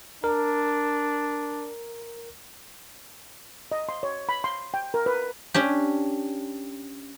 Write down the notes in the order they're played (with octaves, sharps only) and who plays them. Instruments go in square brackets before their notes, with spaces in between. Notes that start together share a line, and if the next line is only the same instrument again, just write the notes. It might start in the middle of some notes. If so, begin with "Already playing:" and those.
[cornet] D4 [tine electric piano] A#4
[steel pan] D#5
C6
C#5
B5
C6
G5
A#4
B4
[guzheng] C#4 D4 G4